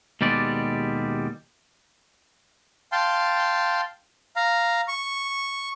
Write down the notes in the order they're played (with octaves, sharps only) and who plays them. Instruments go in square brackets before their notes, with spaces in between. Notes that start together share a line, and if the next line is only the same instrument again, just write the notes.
[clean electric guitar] D#2 B2 G3 G#3 D5
[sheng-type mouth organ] F5 G5 A5 C6
F5 A#5
C#6